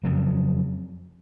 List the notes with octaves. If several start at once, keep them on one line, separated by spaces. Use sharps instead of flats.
F2 C#3 F#3